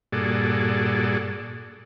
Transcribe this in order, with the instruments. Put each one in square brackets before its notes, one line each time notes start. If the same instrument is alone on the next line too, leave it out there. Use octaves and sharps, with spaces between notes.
[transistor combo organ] G2 A#2 F#4 G#4 A4 D5